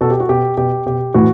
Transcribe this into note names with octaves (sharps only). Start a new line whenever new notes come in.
B2 F#4 A4
G4
F#4
B2 G4
B2 G4
B2 G4
A2 E3 F#4